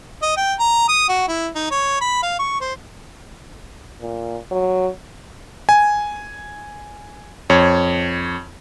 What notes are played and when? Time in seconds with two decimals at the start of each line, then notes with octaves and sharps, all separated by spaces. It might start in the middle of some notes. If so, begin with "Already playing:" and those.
0.22 D#5
0.37 G5
0.59 A#5
0.89 D#6
1.09 F#4
1.28 E4
1.55 D#4
1.71 C#5
2.01 B5
2.23 F5
2.39 C#6
2.61 C5
4.01 A#2
4.51 F#3
5.69 G#5
7.50 F2 C#5